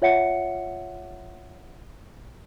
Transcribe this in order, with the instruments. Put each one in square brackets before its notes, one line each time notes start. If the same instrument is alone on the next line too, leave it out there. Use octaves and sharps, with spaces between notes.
[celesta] F4 C#5 E5 F#5 C#7